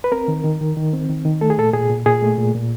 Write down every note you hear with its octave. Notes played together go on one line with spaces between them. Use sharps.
B4
C4 A#4
D#3
D#3
D#3
D#3
C4
D#3
D#3
A3 A4
G#4
A#2 A4
A#2 G#4
A#2
A#2 G#4
A3
A#2
A#2